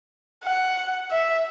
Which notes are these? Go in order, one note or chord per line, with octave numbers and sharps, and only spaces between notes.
F#5
E5